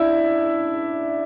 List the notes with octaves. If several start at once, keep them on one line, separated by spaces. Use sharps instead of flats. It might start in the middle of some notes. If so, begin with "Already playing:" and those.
Already playing: D4 E4 E5